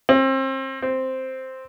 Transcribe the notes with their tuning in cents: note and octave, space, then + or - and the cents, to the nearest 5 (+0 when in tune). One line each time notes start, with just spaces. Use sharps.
C4 +35
C4 +0